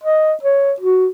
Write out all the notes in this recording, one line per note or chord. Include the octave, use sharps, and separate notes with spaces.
D#5
C#5
F#4